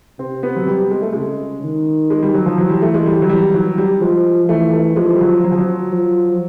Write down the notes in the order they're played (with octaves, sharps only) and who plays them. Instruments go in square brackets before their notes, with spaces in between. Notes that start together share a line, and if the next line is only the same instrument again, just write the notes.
[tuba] C3 [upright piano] C4
[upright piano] B3
F#3
G3
G#3
A3
[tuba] C#3 [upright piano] G#3
[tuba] D#3
[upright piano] G#3
G3
F#3
F3
[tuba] E3 [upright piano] F#3
[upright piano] G3
A3
G#3
G3
F#3
G3
F#3
G3
[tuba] F3 [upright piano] G#3
[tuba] E3 [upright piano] A3
[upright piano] A3
[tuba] F3 [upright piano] G#3
[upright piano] G3
F#3
F#3
F3
F#3
[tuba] F3